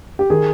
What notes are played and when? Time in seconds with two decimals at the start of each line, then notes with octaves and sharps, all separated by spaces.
0.19 G4
0.30 D#3 G#4